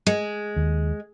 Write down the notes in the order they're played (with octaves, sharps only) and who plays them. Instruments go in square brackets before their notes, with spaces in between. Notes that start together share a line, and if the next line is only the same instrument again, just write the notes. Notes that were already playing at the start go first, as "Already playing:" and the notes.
[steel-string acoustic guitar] G#3
[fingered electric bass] D#2